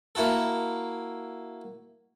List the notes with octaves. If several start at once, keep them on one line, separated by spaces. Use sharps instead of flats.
A#3 E4 F#4 A4